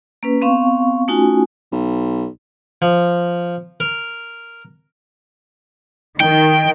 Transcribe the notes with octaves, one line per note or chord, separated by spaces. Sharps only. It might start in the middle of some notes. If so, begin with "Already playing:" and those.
A#3 C#4 B4
B3 C4 F5 C#6
A3 C#4 D#4 F4 F#4 G#5
B1
F3
A#4
D#3 G5